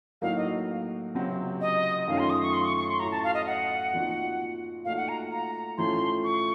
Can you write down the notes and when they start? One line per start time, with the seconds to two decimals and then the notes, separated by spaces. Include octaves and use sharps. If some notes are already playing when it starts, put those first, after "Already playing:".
0.22 A2 F#3 A#3 D#4 F#4 F5
0.37 D#5
1.15 C#2 C3 F#3 C4
1.61 D#5
2.08 F#2 D#3 A3 C#4 F4 F5
2.18 C6
2.30 D#6
2.43 C#6
2.53 C6
2.65 C#6
2.77 C#6
2.89 C6
3.00 A2 A3 C#4 F#4 A#5
3.11 A5
3.24 F5
3.34 D#5
3.47 F#5
3.93 A#2 F3 C4 D#4 F#4
4.85 A#2 A3 D#4 F#4 F5
4.97 F#5
5.09 A#5
5.31 A#5
5.78 A2 F3 A3 C#4 F4 C6
6.24 C#6